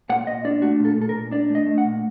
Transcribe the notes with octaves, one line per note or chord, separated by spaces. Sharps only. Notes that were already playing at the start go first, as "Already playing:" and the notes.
A#2 F#5
A#2 D#5
D4 D5
A3 F#4
A#2
A4
A#2
A4
A#4
A#2
D4 D5
A3
D#5
A3
F#5
A#2